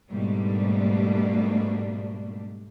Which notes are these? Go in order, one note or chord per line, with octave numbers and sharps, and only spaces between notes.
G#2 B2 G3 A3 A#3 D4